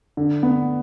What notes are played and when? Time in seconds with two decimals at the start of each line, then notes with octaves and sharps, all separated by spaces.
0.17 D3
0.43 B3